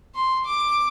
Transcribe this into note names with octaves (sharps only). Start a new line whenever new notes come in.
C6
D6